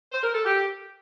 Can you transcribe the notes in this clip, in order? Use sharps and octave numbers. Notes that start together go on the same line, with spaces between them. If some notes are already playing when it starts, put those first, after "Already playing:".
C5
A#4
A4
G4